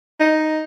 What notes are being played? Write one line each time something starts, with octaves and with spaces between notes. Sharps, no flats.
D#4